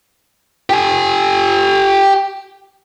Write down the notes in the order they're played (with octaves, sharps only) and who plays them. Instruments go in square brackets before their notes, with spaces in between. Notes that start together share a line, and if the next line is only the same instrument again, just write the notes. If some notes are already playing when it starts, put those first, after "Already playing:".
[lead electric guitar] G4 G#5